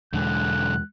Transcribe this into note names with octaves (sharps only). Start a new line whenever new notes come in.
B1 E2 D3 G#3 F#6